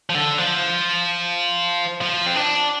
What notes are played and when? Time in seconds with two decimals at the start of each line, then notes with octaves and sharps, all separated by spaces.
0.10 F3
0.15 D3
0.38 F3
2.01 F3
2.26 C4
2.36 D4